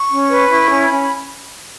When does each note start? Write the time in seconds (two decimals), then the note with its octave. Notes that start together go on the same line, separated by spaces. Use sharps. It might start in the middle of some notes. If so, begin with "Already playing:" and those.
Already playing: C#6
0.10 C#4
0.30 B4
0.50 E4 C#6
0.70 C#4
0.80 B5
0.90 C#4